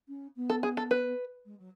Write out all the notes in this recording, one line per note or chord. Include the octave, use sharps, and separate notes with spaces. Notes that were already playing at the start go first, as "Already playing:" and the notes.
C#4
B3
A4
G#4
A4
B4
G#3
F#3